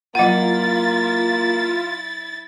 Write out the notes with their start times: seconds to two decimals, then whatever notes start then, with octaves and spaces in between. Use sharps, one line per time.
0.15 F#3 A#3 E4 F4 F#5 A6